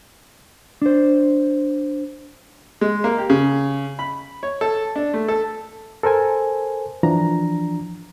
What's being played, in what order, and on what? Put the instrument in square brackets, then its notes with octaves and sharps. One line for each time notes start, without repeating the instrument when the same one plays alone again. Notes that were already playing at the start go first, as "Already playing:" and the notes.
[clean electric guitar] D4 C5
[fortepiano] G#3
A#3
G4
C#3
B5
C#5
A4
D4
A3
A4
[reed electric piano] A4 A#4 C5 G#5
E3 F3 D4 A#5